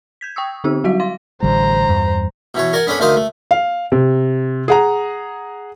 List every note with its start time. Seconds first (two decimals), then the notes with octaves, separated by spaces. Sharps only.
0.21 G6 G#6 B6
0.36 G5 C#6 D#6 E6
0.64 D3 C4 D#4 G4 E6
0.84 F#3 G3 F#4 E5 B6
1.00 F5 C6 A#6
1.43 A1 D3 G3 C5 A#5
1.88 E2 G2
2.54 B2 E3 C#5
2.73 A#4 D5 F#5 G#5
2.87 B3 C#4 D4 A4 B4
3.00 D2 D#3 A3 C5 F5 D#6
3.16 A3
3.51 F5
3.92 C3
4.68 G#4 F#5 A#5